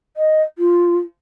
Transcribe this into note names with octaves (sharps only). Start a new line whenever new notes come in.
D#5
F4